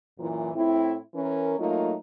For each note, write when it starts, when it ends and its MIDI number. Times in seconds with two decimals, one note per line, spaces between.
0.19 0.51 42
0.19 0.51 46
0.19 0.51 52
0.55 0.98 45
0.55 0.98 60
0.55 0.98 64
1.15 1.56 52
1.15 1.56 61
1.15 1.56 70
1.59 1.95 54
1.59 1.95 57
1.59 1.95 58
1.59 1.95 63
1.59 1.95 65